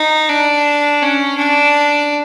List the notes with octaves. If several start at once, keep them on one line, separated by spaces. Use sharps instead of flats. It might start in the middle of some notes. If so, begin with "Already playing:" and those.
Already playing: D#4
D4
C#4
D4